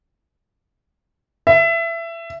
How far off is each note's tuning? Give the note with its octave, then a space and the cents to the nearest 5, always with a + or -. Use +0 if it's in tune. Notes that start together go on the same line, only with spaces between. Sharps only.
E5 +20